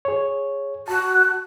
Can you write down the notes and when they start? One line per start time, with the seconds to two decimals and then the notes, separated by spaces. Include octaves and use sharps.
0.05 G#4 C#5
0.88 F#4 A5